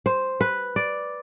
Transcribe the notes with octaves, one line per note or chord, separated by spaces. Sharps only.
C5
B4
D5